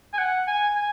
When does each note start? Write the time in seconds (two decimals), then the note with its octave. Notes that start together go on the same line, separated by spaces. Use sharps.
0.13 G#5
0.19 F#5
0.47 G#5
0.76 G#5